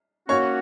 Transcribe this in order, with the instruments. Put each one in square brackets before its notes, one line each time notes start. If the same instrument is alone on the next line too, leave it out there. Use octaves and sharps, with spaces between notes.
[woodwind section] A#3 C#4 F#4 [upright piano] C#5 C#6